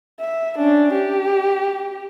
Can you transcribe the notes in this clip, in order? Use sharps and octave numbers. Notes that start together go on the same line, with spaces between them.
E5
C#4 D4
G4